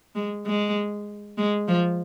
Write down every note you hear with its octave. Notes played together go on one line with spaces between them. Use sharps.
G#3
G#3
G#3
F3